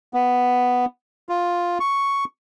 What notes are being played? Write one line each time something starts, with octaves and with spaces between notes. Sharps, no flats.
B3
F4
C#6